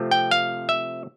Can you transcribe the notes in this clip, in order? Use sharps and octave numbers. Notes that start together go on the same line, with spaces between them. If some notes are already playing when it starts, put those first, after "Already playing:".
Already playing: C3 F3 A3 C4
G5
F5
E5